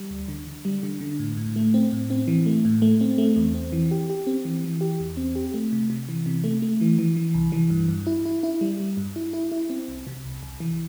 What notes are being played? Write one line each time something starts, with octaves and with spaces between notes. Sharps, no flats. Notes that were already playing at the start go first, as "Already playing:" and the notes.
Already playing: G3
D2
D3
D3
G3
D3
D3
A2
A2
A3
C4
A2
C4
E3
A3
A2
A3
C4
A3
E2
C4
E3
G4
G4
C4
E3
E3
G4
E2
C4
G4
A3
C3
C3
E3
C3
A3
A3
E3
E3
E3
C2
E3
G2
G2
E4
E4
E4
G3
G3
G2
E4
E4
E4
C4
C2
C3
C2
C2
E3